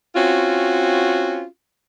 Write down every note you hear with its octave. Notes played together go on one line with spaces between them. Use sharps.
C4 C#4 F4 F#4